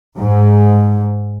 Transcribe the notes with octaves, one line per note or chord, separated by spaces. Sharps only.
G#2